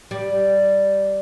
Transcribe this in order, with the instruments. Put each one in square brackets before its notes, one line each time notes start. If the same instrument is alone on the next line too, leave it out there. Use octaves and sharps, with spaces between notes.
[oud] G3